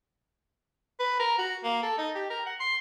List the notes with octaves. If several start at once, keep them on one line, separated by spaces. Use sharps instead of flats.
B4
A#4
F#4
A#3
A4
D#4
G4
A#4
F#5
C6